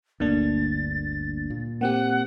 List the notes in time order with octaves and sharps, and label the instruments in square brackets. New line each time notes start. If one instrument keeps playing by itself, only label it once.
[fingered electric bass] G1 D2 [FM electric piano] D3 A#3 D4 [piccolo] A6
[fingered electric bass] A#2
[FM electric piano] A#3 C4 G4 [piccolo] F#5